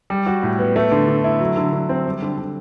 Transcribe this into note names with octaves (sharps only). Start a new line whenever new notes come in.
G3
F#4
A2
B3
A3
D3
D3
E4
F#3
D3
D3
C4
G3
D3
D3